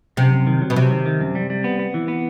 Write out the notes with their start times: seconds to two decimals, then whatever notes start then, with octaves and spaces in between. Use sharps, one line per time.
0.17 F#2 C3
0.32 F#2
0.47 D#3
0.62 F#3
0.70 B2
0.76 C3 F#3
0.91 D#3
1.06 D#3
1.20 F#2
1.35 G3
1.50 G3
1.64 B3
1.79 B3
1.94 E3
2.08 B3